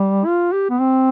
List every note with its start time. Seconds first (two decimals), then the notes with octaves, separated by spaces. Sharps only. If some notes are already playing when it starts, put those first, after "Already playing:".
Already playing: G3
0.26 F4
0.52 G4
0.69 B3
0.80 C4